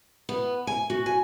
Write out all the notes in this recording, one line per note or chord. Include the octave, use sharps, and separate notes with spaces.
B3
G#5
F#4
G#5